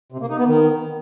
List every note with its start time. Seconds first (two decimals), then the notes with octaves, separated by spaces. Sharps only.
0.12 C3
0.21 A#3
0.29 D#4
0.38 B3
0.47 D#3